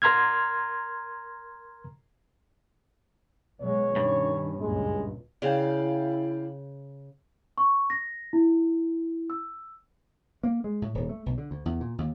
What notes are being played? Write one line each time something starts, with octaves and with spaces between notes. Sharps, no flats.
A#4 A#5 C6 F6 G#6
B2 F#3 G#3 C#5
G2 D#3 C#4
C#2 F#2 A#2 G#3
C#3 E4 D5 F5 G5
C#6
A#6
E4
E6
A#3
G#3
A2
D#1
A3
B1
D3
D2
E2
A#2
D#2